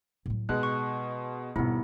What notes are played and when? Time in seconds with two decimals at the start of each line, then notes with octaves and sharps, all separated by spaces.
0.26 A2 F#3
0.49 B2 G#3 D#4 F#6
0.63 C#6
1.56 D#1 G#2 B2 B3 E4